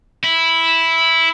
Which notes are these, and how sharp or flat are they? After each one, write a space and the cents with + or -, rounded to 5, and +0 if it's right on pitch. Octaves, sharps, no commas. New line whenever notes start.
E4 -5